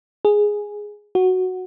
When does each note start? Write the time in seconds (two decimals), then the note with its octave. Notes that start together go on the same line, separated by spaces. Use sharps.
0.25 G#4
1.15 F#4